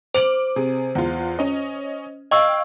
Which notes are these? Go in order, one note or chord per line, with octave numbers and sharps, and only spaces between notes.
C5 D6 D7 F#7
C3 G#4
E2 F4
C#4 D#5
D#5 F5 G5 C#6 E6